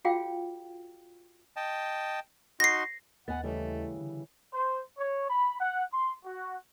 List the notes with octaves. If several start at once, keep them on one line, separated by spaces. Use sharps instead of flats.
F4 F#4 G#4 C#5 F5 G5
D#5 G5 A5
D#4 F#4 C6 A#6 C7
D#2 B3 D#5 F#5 G#5 A6
C#3 E3 G3 A3
D3
C5
C#5
B5
F#5
C6
F#4